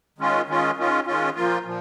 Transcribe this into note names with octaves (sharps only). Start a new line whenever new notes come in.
D#3 G#3 C#4 F4
D#3 G#3 C#4 F4
D#3 G#3 C#4 F4
D#3 G#3 C#4 F4
A#2 F3 A#3 F4
A#2 F3